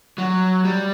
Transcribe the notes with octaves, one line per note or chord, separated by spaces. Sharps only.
F#3
G3